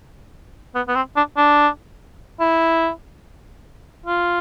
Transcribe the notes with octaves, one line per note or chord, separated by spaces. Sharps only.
B3
B3
C4
D4
D4
E4
F4